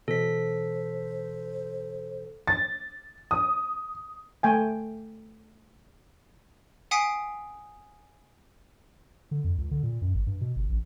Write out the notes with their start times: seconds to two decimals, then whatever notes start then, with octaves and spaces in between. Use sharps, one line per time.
0.08 B2 E3 A4 C5 B6
2.47 A6
3.31 D#6
4.43 A3 G5 G#5
6.91 F#5 G#5 D#6 B6 C7 D7
9.31 D3
9.44 F2
9.58 C#2
9.71 D3
9.83 A#2
10.02 F#2
10.14 G#1
10.27 G2
10.41 B2
10.56 G1
10.69 A1